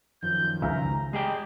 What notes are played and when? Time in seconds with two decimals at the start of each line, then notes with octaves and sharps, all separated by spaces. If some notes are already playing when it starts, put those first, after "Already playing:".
0.23 F#2 D#3 F3 G6
0.62 C#2 C#3 E5 F5 A#5
1.13 G#3 G4 G#4 D#5 G5